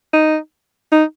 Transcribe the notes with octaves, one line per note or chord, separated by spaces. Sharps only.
D#4
D#4